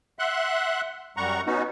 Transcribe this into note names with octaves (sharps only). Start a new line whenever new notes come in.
E5 F#5 C6 F#6
F#2 G3 F#5 A#5 C#6
B3 C#4 D#4 F#4